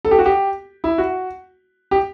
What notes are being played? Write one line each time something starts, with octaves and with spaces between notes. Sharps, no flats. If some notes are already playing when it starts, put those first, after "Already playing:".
A4
G4
F#4
G4
E4
F#4
G4